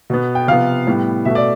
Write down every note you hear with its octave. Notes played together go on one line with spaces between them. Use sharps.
B2 B3
G5
C3 F3 B3 F5
A2 G3 B3
B2 A3 E5
D5